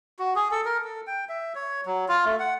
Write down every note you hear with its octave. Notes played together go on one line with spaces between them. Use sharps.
F#4
G#4
A4
A#4
A4
G5
E5
C#5
F#3
F4
A3
F#5